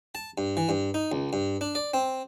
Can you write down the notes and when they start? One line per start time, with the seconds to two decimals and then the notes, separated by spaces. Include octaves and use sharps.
0.15 A5
0.38 G2
0.57 E3
0.69 G2
0.94 D#4
1.12 C#2
1.33 G2
1.61 D4
1.75 D5
1.94 C4